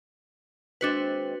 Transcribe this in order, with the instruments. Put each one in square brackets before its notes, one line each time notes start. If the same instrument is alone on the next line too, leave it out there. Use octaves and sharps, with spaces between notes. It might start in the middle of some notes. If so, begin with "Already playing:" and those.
[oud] D#2 G#3 C4 [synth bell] D4 F#4 B4